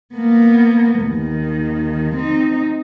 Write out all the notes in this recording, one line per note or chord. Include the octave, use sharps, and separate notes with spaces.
A#3 B3
D#2 D#3
C4 D#4